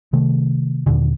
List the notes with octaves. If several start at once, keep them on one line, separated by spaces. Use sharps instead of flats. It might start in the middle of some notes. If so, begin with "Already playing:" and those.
C3 D#3 A3
D#2 A#2 D3